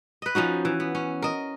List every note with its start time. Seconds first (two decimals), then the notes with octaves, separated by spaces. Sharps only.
0.22 B4 D#5
0.35 F3 C#4 D#4 F#4
0.65 E3
0.80 B3
0.95 C#4
1.22 A#4 D#5